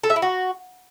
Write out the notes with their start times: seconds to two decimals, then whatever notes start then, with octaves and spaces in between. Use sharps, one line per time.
0.04 A4
0.10 E5
0.16 E4
0.22 F#4